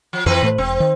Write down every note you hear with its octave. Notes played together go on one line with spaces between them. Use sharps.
F3
F2 E3 C4 B4
A2 A3
E1 C4
D#3